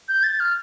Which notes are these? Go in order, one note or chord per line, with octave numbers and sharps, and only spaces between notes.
G6
A6
F6